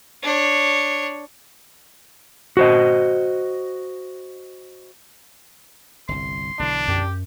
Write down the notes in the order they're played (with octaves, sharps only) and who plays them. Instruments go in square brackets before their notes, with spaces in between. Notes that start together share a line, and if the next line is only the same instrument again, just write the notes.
[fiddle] D4 C#5
[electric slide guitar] F#4 C5 D#5
[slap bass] G1 C2 [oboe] C6
[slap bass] B1 D3 E3 [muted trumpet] D4
[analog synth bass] F#2 [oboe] G4